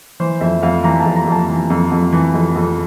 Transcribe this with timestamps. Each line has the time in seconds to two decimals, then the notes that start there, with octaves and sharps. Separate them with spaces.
0.20 E3 C5
0.41 F2 E5
0.62 F2 F5
0.84 E3 A#5
1.00 A5
1.06 F2
1.16 A#5
1.28 F2 A5
1.49 E3
1.70 F2
1.92 F2
2.12 E3
2.34 F2
2.56 F2